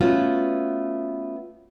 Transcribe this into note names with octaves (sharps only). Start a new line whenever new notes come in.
A3 B3 C#4 F4 F#4